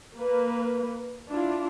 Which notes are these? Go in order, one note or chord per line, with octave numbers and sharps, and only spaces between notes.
A#3 B4
D4 E4 F4